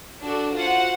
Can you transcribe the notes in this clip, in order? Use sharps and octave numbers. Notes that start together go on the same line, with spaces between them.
D4 F#4 A4
F4 F#4 C5 F#5